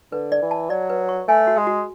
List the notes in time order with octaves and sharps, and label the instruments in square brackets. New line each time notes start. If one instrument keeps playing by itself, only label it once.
[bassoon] D3 [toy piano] B4
[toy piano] D5
[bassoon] E3
[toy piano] A5
[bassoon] F#3 [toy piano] D5
[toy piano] B4
C#6
[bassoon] A3 [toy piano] G#5
[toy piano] F#4
[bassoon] G#3
[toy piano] F#4